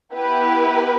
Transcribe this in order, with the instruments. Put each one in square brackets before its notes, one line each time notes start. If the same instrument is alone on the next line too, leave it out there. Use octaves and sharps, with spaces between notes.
[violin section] B3 E4 G4 B4